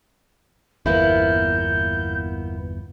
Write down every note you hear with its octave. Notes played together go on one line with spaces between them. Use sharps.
G1 E2 A#3 B3 E4 G6